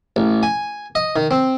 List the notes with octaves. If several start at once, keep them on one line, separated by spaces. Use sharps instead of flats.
A1
G#5
D#5
D#3
C4